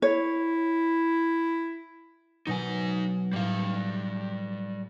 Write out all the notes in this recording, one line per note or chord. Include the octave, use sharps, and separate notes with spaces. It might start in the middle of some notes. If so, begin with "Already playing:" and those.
E4 C#5
B2 F#3 D#4 G#5
A2 G3 F5